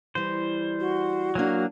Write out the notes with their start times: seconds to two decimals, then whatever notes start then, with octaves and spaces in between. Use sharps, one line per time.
0.15 E3 G3 C5
0.80 F#4
1.35 F#3 A#3 D4 G#5